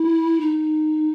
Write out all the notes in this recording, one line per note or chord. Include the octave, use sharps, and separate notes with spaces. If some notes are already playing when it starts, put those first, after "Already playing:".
Already playing: E4
D#4